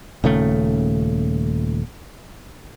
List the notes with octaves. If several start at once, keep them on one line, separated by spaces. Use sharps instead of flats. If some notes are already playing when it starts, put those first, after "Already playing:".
D#1 C#3 A3